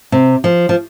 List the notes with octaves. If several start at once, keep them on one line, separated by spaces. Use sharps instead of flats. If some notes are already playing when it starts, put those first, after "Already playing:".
C3
F3
F3